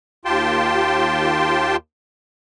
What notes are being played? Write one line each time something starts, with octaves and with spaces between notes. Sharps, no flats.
D#2 F4 G4 G5 A5 C6